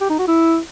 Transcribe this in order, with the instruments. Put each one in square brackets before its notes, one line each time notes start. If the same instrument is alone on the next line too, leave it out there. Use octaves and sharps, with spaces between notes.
[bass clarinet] G4
D#4
F#4
E4